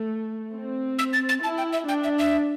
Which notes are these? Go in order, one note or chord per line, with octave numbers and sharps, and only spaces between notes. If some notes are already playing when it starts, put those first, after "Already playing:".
Already playing: A3
C4
E6
A6
A6
E4 A5
G5
E5
D4 G5
E5
E5